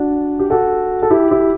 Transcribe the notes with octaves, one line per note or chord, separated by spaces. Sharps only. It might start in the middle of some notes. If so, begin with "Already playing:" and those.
Already playing: D4 F#4
G4
F#4 A4
A4
E4 G4
E4 G4